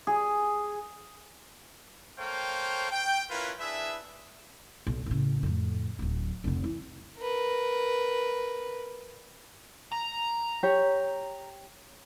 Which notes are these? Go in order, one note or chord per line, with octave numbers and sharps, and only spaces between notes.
G#4
A#3 A4 C5 C#5 F5 G5
G5
C#4 E4 F4 A#4 B4
D4 E4 G#4 B4 E5
B1
A1 C#3
F2 A2
D1 F#3
F1 D3
E3
A#4 B4
A#5
G4 C#5